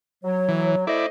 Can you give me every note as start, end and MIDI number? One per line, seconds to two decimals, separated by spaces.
0.24 0.87 54
0.24 0.85 73
0.49 0.75 52
0.87 1.07 57
0.87 1.06 64
0.87 1.07 72
0.87 1.06 74
0.87 1.07 75